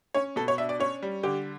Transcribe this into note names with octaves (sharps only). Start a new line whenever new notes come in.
C#4 C#5
B2 A4
C#5
D4 E5
D5
C#4 C#5
G3
D3 G4